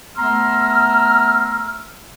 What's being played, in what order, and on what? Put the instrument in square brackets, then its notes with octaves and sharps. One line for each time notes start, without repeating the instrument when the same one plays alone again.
[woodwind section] A3 B3 A#5 C6 E6 F6